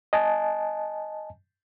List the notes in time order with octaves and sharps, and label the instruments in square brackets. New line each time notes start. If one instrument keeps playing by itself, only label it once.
[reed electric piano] D#5 G#5 A5